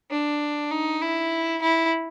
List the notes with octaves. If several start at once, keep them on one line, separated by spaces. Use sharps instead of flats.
D4
D#4
E4
E4